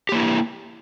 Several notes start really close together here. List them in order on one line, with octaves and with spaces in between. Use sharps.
G4 A#3 E4